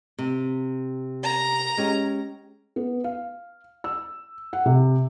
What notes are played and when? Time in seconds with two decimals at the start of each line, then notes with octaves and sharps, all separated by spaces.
0.19 C3
1.23 A#5
1.77 G#3 C#4 G4
2.76 B3
3.04 F5
3.84 E6
4.53 F#5
4.66 C3